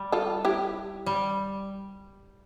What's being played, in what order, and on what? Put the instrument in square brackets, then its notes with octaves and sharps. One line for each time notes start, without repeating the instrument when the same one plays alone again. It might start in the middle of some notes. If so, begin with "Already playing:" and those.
Already playing: [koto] G3
[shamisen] F4 A4
E4 G4
[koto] G3